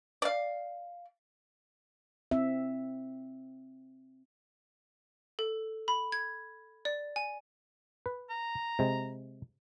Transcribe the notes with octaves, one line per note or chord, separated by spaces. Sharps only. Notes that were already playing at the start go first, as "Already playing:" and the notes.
D5 F5
C4 E5
A4
B5
G#6
D5
G#5
B4
A#5
C3 G#3